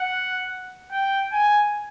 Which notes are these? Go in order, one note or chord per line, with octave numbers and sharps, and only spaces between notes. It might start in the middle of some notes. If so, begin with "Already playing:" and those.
Already playing: F#5
G5
G#5